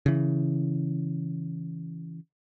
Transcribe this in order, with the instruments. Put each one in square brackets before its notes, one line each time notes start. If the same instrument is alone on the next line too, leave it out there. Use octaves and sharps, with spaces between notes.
[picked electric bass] C#3 E3